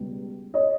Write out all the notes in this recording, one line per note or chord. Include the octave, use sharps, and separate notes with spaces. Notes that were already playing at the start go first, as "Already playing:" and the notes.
Already playing: C#2 B2 G3
C#5 D#5